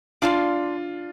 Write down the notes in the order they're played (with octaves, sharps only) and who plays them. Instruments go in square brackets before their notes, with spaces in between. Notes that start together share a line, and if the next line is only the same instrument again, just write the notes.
[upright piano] D4 F4 [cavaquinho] D5 F5 A5 C6